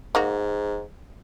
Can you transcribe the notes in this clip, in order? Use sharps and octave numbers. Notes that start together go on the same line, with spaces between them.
G#2 A#3 D#4 F#4